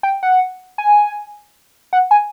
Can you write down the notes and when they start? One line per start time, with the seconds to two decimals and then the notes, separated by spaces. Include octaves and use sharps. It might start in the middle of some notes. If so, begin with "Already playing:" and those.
0.03 G5
0.23 F#5
0.78 G#5
1.93 F#5
2.11 G#5